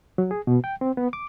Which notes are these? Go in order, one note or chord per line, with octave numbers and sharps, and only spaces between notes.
F#3
G#4
B2
G5
C4
B3
D6